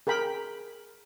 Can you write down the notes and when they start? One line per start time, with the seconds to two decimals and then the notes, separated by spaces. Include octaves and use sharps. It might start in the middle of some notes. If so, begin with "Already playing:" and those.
0.07 G#4 A#4 G5 B5